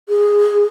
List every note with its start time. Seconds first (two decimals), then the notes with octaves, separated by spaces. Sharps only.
0.08 G#4